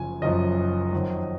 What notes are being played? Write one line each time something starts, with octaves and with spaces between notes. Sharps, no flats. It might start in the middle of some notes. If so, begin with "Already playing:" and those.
Already playing: F#1 F#2 F3 G#5
F#1 F#2 F3 D#5
F2 D#3 F#3